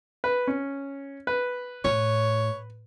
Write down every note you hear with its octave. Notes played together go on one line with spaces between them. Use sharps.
B4
C#4
B4
A2 C#5